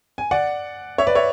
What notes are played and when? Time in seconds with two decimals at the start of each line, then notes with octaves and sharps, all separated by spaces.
0.18 G#5
0.31 D5 F#5
0.98 C#5 E5
1.07 B4 D5
1.15 C#5 E5